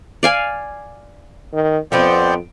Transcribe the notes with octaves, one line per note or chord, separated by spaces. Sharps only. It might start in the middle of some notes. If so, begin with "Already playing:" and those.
D5 F5 G#5
D#3
F2 F3 B3 C4 C5 D5 G5